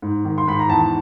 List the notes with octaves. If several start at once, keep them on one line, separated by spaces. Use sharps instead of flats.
G#2
D#3
C6
G#2 B5
A#5
E2 A5